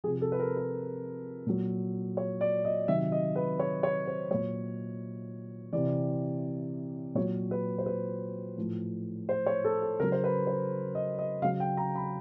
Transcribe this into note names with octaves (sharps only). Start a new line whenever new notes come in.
C3 F3 G#4
A4
B4
A#4
B4
A#2 F#3
C#5
D5
D#5
C3 D#3 F#3 E5
D#5
B4
C#5
C#5
C5
A#2 F#3 C#5
C3 E3 D5
A#2 F#3 C#5
B4
C5
B4
A2 F3
C5
C#5
A4
A4
C#3 F#3 A#4
C5
B4
C5
D#5
D#5
C#3 F#3 F5
G5
A#5
B5